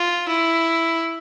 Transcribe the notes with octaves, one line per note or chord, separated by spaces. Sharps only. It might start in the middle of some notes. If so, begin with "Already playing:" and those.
Already playing: F4
E4